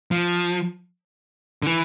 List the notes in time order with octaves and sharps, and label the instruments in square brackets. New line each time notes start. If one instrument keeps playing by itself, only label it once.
[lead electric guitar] F3
D3
E3